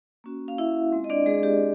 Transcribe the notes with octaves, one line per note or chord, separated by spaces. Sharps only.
A#3 C#4 F#4
F5
E4 E5
G#3 C4 F4
D#5
D4 D5
G#3 G#4
G4